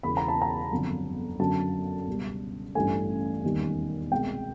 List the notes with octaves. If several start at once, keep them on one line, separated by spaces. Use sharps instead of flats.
E1 E2 C#3 E3 B5
A#5
A5
A#5
G1 F2 D3 F#3
F#2 D3 F#3 A5
C#2 B2 G3
A1 G2 E3 A3 G#5
E1 D#2 D#3 G3
C2 B2 G#3 G5